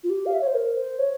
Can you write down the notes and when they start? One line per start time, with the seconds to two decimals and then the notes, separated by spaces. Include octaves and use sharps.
0.04 F4
0.10 G4
0.26 F5
0.33 E5
0.41 C#5
0.47 C5
0.55 A#4
0.77 C5
0.99 C#5